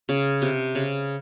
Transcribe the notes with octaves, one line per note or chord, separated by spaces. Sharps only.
C#3
C3
C#3